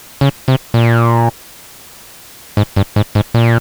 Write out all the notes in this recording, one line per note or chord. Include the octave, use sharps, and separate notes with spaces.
C#3
C3
A#2
G#2
G2
G#2
G#2
A#2